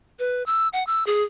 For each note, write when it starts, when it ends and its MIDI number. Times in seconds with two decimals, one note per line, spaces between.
0.19 0.45 71
0.46 0.68 88
0.73 0.86 78
0.87 1.04 88
1.07 1.23 68